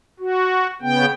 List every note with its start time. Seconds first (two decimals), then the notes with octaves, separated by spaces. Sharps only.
0.20 F#4
0.82 C#3 B3 G5